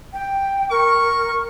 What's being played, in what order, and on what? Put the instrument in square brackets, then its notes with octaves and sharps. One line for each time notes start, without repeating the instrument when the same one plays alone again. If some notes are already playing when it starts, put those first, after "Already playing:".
[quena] G5
[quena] A#4 [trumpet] C#6